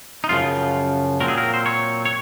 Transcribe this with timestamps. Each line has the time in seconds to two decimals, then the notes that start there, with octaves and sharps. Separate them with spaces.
0.24 D#4
0.29 F#2 C#3 F3 F4
1.20 A#2 F#3 C4 A#4
1.28 G#4
1.37 A#4
1.54 C5
1.66 C#5
2.05 C#5